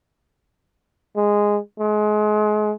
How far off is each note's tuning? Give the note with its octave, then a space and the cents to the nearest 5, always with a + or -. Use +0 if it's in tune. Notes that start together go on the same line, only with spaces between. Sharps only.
G#3 -10
G#3 +30